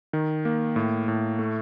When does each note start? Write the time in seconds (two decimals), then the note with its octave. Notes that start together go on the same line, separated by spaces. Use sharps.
0.13 D#3
0.45 A#3
0.76 A2
1.08 A2
1.39 A3